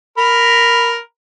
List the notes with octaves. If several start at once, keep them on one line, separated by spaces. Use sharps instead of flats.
A#4 B5